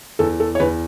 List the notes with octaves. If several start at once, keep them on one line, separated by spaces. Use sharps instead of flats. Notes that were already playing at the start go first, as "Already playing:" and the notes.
E2 A4
A4
C#5
E2 B4